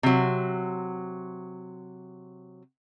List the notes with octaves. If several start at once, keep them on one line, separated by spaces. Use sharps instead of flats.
C3 F#3